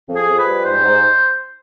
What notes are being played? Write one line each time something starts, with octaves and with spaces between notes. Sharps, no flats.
F2
G#4
F2
B4
G3
G#2 C5
G#2